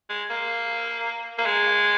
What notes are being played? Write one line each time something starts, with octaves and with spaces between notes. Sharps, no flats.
G#3
A#3
A#3
G#3